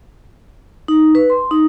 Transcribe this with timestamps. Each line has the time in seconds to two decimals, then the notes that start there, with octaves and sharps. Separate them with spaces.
0.88 D#4
1.15 B4
1.30 C6
1.51 D#4